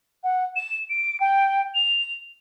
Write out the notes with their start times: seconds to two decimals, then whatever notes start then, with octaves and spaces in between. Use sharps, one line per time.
0.23 F#5
0.56 E7
0.90 D7
1.20 G5
1.75 F7